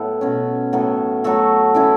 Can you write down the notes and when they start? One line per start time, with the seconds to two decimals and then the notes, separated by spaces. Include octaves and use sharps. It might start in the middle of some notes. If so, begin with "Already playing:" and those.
Already playing: A2 F#3 B3 A4
0.21 B2 A3 C#4
0.73 A2 F#3 B3 A4
1.24 F#3 A3 F#4 A4
1.74 E3 C#4 E4 A4